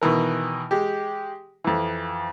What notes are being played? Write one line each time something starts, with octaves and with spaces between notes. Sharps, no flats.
B2 D#3 E3 A#4
G#3 G4
F2 E3